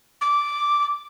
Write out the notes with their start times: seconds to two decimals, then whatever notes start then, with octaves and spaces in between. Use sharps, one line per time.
0.21 D6